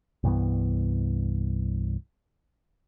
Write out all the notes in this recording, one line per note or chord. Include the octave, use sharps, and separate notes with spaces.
C2 G2 E3 B3